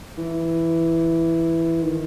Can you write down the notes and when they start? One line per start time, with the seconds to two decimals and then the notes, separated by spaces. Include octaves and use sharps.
0.18 E3
1.83 D#3